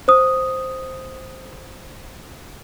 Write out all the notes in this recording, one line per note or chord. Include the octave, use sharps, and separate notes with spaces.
C5 D#6